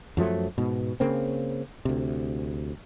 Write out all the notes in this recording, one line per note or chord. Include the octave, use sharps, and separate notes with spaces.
F#2 F3 F#3 A3
G#2 B2
C#3 A#3 C4
D2 C3